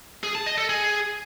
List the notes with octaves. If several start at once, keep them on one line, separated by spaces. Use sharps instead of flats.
G#4
A5
D#5
A4
G#4